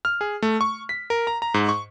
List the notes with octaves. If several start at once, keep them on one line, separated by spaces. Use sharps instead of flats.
F6
G#4
A3
C#6
B6
A#4
A#5
A#5
G#2
C#6